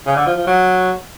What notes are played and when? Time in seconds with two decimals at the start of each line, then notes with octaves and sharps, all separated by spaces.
0.06 C#3
0.16 D3
0.26 F3
0.37 F3
0.47 F#3